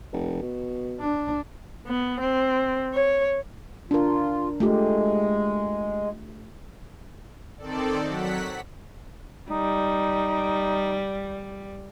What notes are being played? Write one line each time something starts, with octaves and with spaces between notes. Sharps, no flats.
F1
B2
D4
B3
C4
C#5
D4 F4 A#4
G#3 A3 F4 G4
D#3 C4 A4 D5
F#3 F#5 B6
G3 D#4